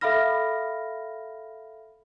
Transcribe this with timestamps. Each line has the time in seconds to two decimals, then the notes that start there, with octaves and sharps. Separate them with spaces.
0.01 A4 E5 F5 B5 F6 A#6